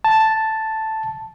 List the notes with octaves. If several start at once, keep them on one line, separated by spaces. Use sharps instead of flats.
A5